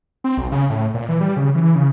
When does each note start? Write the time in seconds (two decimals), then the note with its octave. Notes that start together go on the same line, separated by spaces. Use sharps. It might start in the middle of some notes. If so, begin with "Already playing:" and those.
0.24 C4
0.38 B1
0.52 C#3
0.70 A2
0.94 A#2
1.09 E3
1.21 G3
1.37 C#3
1.55 E3
1.75 C#3